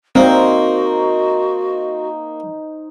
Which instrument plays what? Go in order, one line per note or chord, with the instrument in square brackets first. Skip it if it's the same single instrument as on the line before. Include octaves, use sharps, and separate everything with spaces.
[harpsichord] A#3 [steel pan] C4 [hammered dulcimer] D#4 C5 [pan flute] F#4